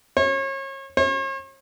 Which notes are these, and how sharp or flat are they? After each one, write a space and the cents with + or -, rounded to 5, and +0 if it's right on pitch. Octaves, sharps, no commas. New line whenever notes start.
C#5 -35
C#5 -45